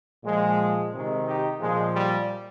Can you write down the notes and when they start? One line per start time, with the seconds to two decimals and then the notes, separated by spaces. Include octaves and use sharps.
0.23 A#2 F3 G#3
0.92 C3 D#3 G#3
1.25 D#4 G4
1.59 A#2 F3 G#3
1.94 G3